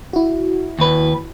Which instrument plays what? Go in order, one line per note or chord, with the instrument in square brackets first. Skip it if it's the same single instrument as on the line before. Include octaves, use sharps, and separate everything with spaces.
[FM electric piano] E4 F#4
[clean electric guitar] D#2 B4